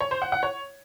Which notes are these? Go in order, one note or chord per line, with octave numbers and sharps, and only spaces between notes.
C#5
C5
F#5
F#5
C#5